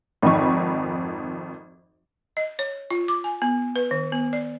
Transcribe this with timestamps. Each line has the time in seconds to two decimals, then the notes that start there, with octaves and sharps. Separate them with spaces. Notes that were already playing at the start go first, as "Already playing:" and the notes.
0.22 G#1 F2 D#4 C#6
2.37 D#5
2.59 C#5
2.91 F4
3.08 D6
3.24 G#5
3.42 B3
3.76 B4
3.91 D#3
4.12 B3
4.33 D5